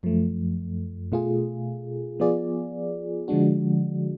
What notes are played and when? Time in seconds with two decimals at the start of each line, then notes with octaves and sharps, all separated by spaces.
0.03 F#2 F3 A3
1.12 B2 A3 F4 G#4
2.20 F3 B3 F4 G#4 D5
3.28 D3 F3 G#3 D4 F#4